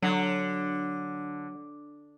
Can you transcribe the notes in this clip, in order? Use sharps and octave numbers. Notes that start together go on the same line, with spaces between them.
D3 F#3